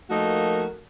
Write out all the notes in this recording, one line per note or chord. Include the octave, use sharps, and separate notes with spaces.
F3 A3 A#3 D#4 F#4 A#4